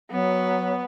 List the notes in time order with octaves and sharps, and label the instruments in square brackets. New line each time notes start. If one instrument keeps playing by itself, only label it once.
[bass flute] F#3 [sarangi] B3